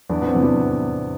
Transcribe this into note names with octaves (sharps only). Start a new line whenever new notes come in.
E2 B3 D4
B3
C4
C3 E3
B3 D4